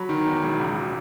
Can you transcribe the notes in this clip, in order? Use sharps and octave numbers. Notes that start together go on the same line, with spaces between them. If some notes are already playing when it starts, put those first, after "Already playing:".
Already playing: F#3 B5
D#3
E2
E1
C#2